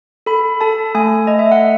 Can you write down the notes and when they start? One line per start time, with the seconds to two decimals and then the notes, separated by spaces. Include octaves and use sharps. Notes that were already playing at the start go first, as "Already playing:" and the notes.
0.26 A4 B5
0.61 A4 A5
0.95 A3 G#5
1.27 A3 D#5
1.39 E5
1.52 F#5